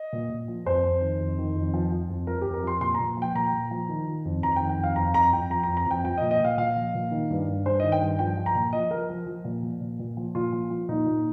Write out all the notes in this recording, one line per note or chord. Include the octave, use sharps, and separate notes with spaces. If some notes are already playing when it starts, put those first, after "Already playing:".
Already playing: D#5
A#2
A#2
F3
F2 C5
F2
D#3
F2
D#3
F2
F3
F3
F2
F3 A#4
G4
F2
A#4
F3 C6
A#2 C6
A#5
A#2
F3 G5
A#2 A#5
A#2
F3
D#3
D#3
F2
F2 A#5
D#3 G5
G5
F2 F5
F2 A#5
F2 A#5
F2 G5
F3 A#5
F2 A#5
A#5
F2 G5
F3 G5
A#2 D#5
D#5
A#2 F5
A#2 F5
F3
A#2
D#3
G2
G2
G2 C5
D#3 D#5
G5
G2
F3 G5
F3
A#5
A#2
F3 D#5
F3 A#4
F3
F3
A#2
F3
A#2
A#2
F3
A#2 F4
F3
F3
A#2 D#4
A#2